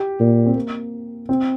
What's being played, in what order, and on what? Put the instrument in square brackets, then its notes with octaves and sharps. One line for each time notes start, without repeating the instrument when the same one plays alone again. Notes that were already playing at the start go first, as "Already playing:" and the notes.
Already playing: [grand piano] G4
[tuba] A#2
[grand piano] C4
A#3
C4